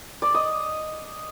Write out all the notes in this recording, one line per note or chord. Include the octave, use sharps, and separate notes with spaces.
D5
D#5